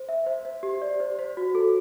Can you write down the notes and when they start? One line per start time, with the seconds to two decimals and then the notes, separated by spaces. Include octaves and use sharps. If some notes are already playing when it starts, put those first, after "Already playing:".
Already playing: C5
0.09 E5
0.26 C5
0.45 C5
0.63 G4
0.82 D5
1.00 C5
1.19 C5
1.37 F#4
1.55 A4